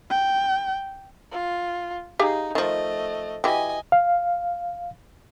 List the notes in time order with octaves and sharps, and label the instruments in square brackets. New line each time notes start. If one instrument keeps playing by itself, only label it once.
[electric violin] G5
[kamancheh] F4
[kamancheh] D#4 [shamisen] G4 G#4 F5
[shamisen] D#3 F3 [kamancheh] A3 D#5
[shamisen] E3 F#4 G4 [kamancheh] D#5 G#5
[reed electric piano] F5